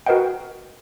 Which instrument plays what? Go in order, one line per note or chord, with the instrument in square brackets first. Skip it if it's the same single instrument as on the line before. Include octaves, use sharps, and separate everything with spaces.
[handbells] F#4 A#4 B4 D#5 F#5 G5